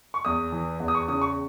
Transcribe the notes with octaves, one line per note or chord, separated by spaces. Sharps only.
C#6
E2 D#6
E3
E2
D#6
C#6
C#3 D#6
C#6